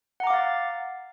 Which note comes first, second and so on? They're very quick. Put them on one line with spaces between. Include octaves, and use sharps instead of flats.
F#5 A#5 D6 F5 A6